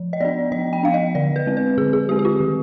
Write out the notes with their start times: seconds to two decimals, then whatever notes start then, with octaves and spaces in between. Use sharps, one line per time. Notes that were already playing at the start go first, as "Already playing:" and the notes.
Already playing: F3
0.13 D#5
0.21 B3 D4 D5
0.52 F3 D#5
0.73 G5
0.83 B3 D4 F5
0.94 D#5
1.15 D3 D5
1.36 B4
1.46 G#3 C4
1.57 B4
1.78 D3 G#4
1.93 G#4
2.09 G#3 C4 G4
2.19 G4
2.25 F4
2.40 D#3